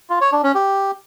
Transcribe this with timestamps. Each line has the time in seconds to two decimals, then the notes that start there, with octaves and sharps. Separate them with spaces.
0.10 F4
0.21 C#5
0.32 D4
0.43 C#4
0.55 G4